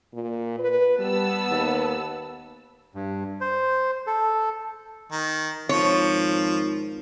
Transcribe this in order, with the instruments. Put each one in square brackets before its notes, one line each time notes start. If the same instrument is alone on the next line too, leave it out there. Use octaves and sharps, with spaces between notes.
[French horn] A#2
B4
[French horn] G3 [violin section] B3 A5 E6
[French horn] D#2
[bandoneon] G2
C5
A4
[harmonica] D#3
[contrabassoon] G#1 [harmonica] F3 [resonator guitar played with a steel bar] C#5